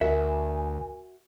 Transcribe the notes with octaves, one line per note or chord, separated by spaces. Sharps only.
D2 F#4 A#4 E5 G#5